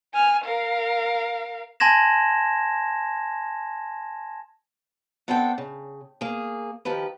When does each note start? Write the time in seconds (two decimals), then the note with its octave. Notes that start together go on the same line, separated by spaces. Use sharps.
0.14 G#5 F6
0.44 A#4 F5
1.80 G#5 A5 C6 G#6 A#6 E7
5.28 B3 C4 D4 A4 F#5 G5
5.58 C#3
6.21 A#3 G#4
6.85 D#3 F3 G4 B4